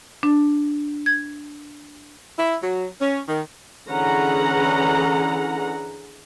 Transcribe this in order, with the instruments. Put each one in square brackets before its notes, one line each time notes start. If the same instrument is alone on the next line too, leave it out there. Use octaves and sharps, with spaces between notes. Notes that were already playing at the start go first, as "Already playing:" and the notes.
[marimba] D4
G#6
[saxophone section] E4
F#3
C#4
D#3
[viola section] D3 E3 C#4 G#4 F#5 A#5